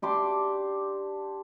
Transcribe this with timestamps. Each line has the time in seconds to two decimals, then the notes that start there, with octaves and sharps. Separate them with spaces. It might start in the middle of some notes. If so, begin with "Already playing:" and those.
0.02 D4 G4 C6 D6